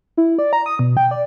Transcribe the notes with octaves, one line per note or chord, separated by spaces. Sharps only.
E4
D5
A#5
D#6
B2
G5
D5